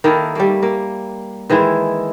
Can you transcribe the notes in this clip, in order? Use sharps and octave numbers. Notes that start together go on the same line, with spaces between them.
D#3 A#3 E4 A4
G3 A3 A#3
A#3
D#3 E3 G#3 E4